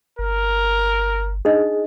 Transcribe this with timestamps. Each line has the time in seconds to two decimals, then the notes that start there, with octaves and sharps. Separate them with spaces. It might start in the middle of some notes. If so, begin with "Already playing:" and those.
0.19 G1 A#4
1.45 D4 D#4 G#4 D#5